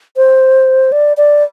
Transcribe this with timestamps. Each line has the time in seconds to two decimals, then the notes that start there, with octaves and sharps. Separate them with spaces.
0.17 C5
0.92 D5
1.17 D5